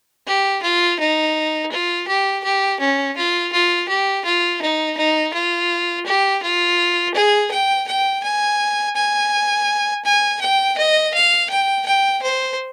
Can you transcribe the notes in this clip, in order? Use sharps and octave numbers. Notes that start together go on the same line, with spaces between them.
G4
F4
D#4
F4
G4
G4
C#4
F4
F4
G4
F4
D#4
D#4
F4
G4
F4
G#4
G5
G5
G#5
G#5
G#5
G5
D#5
F5
G5
G5
C5